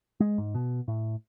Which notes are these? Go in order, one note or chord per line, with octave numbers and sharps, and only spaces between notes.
G#3
G#2
B2
A2